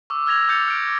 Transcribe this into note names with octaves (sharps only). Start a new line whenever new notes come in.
C#6 D6 E6
E6 F6 G#6 A#6 F7
D6 G6 A6 C#7 F7
F6 D7